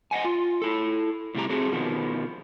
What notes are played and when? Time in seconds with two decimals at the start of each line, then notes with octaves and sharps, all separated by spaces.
0.11 D#5 E5 F#5 G#5
0.25 F4
0.62 E4 A4
1.35 A2 C3 G3 E4 G4 A#5
1.49 A3 C4 F#4 G#4
1.72 B2 D#3 F3 B3